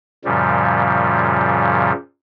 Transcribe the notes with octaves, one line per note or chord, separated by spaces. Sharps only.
F#2 A#2 C#3 F3 G3